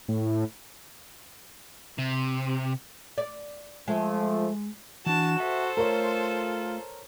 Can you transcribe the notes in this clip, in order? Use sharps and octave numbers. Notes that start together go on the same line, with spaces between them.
A2
C3
D5
F3 G#3 A3
E3 D4 F#4 A5 E7
A4 C5 E5
A3 F4 A#4 C#5